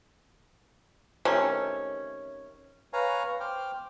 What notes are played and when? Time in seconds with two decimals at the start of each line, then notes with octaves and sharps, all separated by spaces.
1.25 C3 D#3 A3 C#4
2.93 B4 C#5 F5 G#5 A#5
3.40 C5 G5 D6 F6